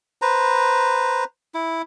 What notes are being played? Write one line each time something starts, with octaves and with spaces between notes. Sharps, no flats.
B4 C5 A#5
E4